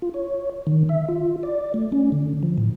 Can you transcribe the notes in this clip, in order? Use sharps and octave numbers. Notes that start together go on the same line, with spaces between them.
F4
C#5
D#3
E5
F4
D5
A3
C#4
D3
F3
A2